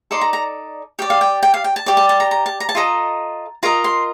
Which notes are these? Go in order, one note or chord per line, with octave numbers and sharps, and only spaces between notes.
D#4 A4 D5 C6
A#5
A#5
G4 D5 G5
F5
G5
G5
F5
G5
A5
G4 D5
A5
A5
A#5
A#5
A5
A#5
A5
F4 A4 D#5 A#5
F4 A#4 D#5 A#5
C6